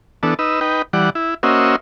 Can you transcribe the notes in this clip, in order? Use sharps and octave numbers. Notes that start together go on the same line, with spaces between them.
E3 B3 D4 A4
D#4 B4 E6
D#4 B4 G5
E3 G3 D5 F#5
E4
A#3 C#4 F#4 C5 D#5 E5